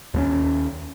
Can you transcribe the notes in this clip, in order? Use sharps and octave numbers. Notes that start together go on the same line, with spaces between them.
D#2 G3 C#4